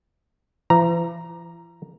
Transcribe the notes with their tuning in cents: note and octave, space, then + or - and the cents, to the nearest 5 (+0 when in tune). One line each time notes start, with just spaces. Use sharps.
E3 +45 A#5 +0